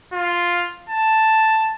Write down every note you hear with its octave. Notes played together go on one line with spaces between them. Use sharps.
F4
A5